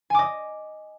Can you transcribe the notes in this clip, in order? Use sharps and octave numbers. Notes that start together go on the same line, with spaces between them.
D#5 G#5 D6